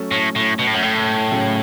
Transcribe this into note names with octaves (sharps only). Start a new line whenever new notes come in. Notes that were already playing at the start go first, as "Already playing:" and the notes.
Already playing: F#3 A3 C#4 A4
A2
A2
B2
A2
F#2
A2
C#3 F#3 C#4